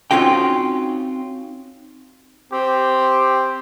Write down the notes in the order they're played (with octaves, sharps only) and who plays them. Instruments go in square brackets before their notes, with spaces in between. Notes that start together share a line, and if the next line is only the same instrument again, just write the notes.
[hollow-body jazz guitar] C4 C#4 D#4 F4 F#4 G5
[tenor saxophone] C4 [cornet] G4